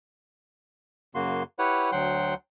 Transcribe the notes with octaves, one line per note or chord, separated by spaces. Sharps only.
F#2 C#3 A#3 F#4 C6
E4 G4 B4 C#5 F#5
D2 F#3 F#5 G5 C6